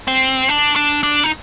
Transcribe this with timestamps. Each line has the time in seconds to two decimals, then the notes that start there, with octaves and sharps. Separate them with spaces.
0.08 C4
0.49 D4
0.76 D4
1.03 D4
1.24 D#4